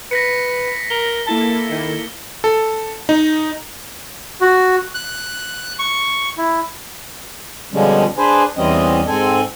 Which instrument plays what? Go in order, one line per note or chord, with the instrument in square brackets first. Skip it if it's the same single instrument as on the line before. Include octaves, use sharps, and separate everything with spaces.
[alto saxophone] B4 [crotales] A#6 B6 C#7
[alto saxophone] A#4 [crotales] G7
[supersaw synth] A#3 E4 A4 [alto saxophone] A5
[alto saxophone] D#3
[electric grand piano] A4
D#4
[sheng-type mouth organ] F#4
F#6
C#6
E4
[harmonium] B2 D3 F3 G3 G#3 C#4
D4 G#4 B4 C5 G#5
E2 E3 G3 C4 C#4 D#5
G#2 C4 A4 G#5